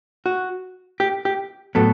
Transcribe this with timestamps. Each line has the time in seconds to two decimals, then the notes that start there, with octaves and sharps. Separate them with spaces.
0.26 F#4
1.00 G4
1.25 G4
1.75 A2 F#3 B3 A4